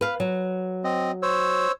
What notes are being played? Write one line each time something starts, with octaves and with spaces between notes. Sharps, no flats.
B4 F5
F#3
C4 D#5
C5 C#5 E6